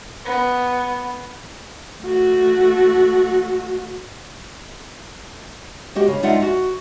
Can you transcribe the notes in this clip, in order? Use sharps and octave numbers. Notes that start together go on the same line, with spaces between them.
B3
A3 F#4
G#3 F#4 G4 D#5
C#3
G#3 D#4 F4 D5 E5 F#5
F#4